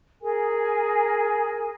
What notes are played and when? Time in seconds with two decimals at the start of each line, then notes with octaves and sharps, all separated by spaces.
0.22 G#4 A#4 G#5